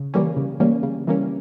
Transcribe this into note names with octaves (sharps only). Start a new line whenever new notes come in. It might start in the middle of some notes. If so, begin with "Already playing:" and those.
Already playing: C#3
E3 G3 A#3 C#4
C#3
E3 G3 A#3 C#4
C#3
E3 G3 A#3 C#4